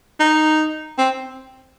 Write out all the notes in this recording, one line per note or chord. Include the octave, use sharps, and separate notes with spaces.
D#4
C4